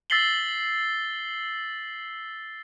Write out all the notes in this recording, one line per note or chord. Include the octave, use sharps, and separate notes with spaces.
E6 A6 B6 C7 F#7 G7